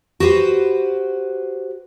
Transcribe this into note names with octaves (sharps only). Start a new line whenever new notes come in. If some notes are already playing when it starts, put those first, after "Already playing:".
F#4 G4 B4 C5